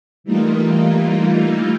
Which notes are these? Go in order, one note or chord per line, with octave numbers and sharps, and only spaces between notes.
E3 G3 A3 A#3 D#4 F4